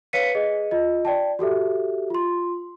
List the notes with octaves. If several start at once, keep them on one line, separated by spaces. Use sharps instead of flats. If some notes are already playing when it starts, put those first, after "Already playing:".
B4 C#5 F5 B6 C#7 D#7
G#4 D#5
F4 D#5
D5 G5 A5
F#4 G4 A4 E5
F4 C6